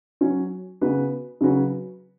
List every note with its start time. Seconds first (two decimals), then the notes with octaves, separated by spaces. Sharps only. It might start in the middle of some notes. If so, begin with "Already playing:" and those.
0.21 F#3 C#4 F#4
0.81 C#3 B3 F#4 B4
1.41 C#3 F#3 C#4 F#4 B4